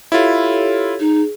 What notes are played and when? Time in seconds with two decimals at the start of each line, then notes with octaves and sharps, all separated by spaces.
0.12 E4 F4 G4 A4 C#5
1.00 D#4 G#4